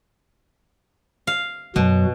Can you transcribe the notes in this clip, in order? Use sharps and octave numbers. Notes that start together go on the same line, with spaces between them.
F5
F#2 B2 F#3